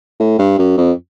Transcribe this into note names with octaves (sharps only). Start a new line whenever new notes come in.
A2
G2
F#2
F2